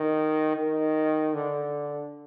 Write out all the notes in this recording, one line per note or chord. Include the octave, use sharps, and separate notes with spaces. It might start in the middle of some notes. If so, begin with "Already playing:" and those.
Already playing: D#3
D#3
D3